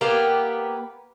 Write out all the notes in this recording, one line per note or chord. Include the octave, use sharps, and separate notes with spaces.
A#3 B3 G4 F5